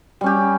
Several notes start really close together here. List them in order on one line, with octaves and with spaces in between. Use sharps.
G3 C#4 G4